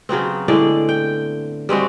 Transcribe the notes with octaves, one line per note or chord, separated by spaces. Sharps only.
C#3 F#3 B3 C4
A2 D3 G#3 D5
G5
G3 G#3 C4 F#4